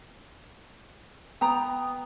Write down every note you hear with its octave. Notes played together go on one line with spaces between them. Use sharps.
B3 G5 A#5